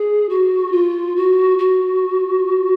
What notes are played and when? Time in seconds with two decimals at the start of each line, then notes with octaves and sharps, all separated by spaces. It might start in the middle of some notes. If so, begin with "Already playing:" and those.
Already playing: G#4
0.29 F#4
0.72 F4
1.16 F#4
1.59 F#4